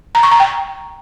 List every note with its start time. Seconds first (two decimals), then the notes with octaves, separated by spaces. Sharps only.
0.15 A#5
0.23 C#6
0.32 A#5
0.40 G5